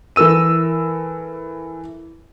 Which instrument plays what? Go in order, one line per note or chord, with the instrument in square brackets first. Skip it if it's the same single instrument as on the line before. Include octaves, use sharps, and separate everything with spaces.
[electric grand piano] E3 A4 A#4 E6 D#7